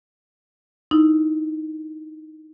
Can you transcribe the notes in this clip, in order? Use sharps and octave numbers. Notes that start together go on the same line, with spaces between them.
D#4 E4